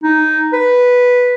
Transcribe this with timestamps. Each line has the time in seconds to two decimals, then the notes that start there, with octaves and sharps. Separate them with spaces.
0.03 D#4
0.53 B4